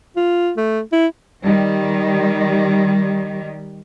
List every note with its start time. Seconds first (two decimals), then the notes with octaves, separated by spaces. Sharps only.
0.16 F4
0.57 A3
0.92 E4
1.44 D#3 G3